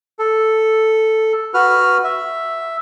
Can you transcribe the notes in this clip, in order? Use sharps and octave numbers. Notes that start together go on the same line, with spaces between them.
A4
F#4 B4 F6
E5